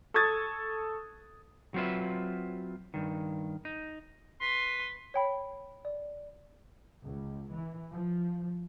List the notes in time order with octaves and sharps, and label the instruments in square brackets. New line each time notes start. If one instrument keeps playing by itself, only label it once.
[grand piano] A4 C#6 D#6 G#6 A6
[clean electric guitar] F#3 C4 F4 B4 E5
G2 D#3
D#4
[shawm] B4 [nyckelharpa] C6
[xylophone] C#5 G5 B5
D5
[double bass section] C#2
E3
F3